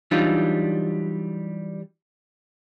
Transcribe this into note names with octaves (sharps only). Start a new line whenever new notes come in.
E3 F#3 G3 D4 D#4 F4